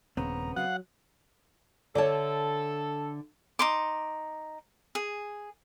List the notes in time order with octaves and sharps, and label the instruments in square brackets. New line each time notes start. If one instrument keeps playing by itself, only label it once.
[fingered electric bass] D#1 [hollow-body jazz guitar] C#3 B3 C4 [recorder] A#5
[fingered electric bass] F#3 [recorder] F5 [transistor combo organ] F#5
[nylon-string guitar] D3 E5 A5 [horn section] A4 [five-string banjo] C#5 D5
[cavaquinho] D#4 C6 D6
G#4